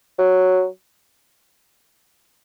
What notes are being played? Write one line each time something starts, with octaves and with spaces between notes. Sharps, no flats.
F#3